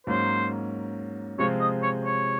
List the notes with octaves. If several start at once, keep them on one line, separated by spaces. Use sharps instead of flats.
G#2 F#3 A#3 C#4 C5
C3 F3 G#3 C4 F4 C#5
D#5
C#5
C#5